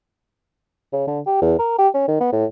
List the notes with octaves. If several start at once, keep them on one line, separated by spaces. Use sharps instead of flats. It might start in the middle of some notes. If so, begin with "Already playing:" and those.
C#3
D3
G4
E2
A#4
G4
C#4
D#3
B3
A2